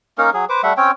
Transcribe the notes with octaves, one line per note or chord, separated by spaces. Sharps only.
A#3 C#4 D#4 A#4
F#3 G#4
B4 C5 D6
G3 A3 E5 F#5
C4 C#4 C#5 G5